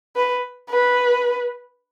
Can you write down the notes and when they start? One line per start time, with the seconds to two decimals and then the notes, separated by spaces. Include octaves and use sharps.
0.16 B4
0.70 B4